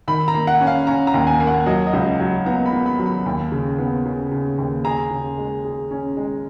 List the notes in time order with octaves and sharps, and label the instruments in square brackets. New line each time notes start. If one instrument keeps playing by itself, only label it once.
[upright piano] D#3 [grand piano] B5
[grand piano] A#5
[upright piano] A#3
[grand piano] F#5
[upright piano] C#4
[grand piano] F5
[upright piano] C#4 [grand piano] A#5
[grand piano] A#5
[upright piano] D#2
[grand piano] G#5
[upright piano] A#3
[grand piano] F#5
[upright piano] F#3 [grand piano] D#5
[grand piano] D#5
[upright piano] C#2
[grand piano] D#5
[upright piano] F#3
[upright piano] B3 [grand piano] A#5
[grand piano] B5
[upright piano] B3
[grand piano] B5
[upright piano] F#3
[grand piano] B5
[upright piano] D#2
C#3
B3
C#3
C#3
D#2
[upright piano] G#4 [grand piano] A#5
[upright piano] C#3
G#3
G#4
C#4
G#3